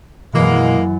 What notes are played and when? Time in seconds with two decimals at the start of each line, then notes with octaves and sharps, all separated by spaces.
0.33 F#2 B2 E3 G#3 A#3